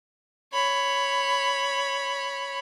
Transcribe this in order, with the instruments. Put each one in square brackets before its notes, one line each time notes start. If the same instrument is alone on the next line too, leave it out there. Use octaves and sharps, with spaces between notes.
[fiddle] C#5 B5